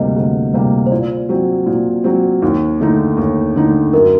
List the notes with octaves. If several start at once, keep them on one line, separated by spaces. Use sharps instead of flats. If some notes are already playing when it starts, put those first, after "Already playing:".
Already playing: D2 C3 G3 A#3 D#5
D2
C3 G3 A#3
C5
A#2 D5
F#3 C4
A#2
F#3 C4
D#2
D3 A3 D#4
D#2
D3 A3 D#4
F#2 A#4